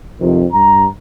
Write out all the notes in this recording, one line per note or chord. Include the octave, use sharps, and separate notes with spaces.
F2 C3 D#3 F3
G2 A#5